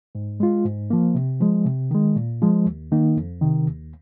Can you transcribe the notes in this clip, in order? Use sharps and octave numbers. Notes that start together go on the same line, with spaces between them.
G#2
G#3 F4
G#2
F3 A#3
C3
F3 G#3
C3
D#3 G#3
A#2
F3 G#3
D#2
D#3 A#3 D#4
F2
C3 D#3
D#2